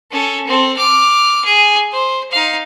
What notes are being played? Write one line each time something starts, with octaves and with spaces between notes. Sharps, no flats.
C#4 A4
C4 A4
D6 F6
G#4
C5
D#4 F5